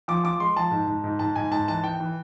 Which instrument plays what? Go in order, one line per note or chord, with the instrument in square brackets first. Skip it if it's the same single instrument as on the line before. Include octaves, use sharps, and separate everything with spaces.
[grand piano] F3 D6
F3 D6
G#3 C6
F3 A5
G#2
G#2
G#2
G#2 A5
G#2 G#5
G#2 A5
E3 A5
E3 G5
E3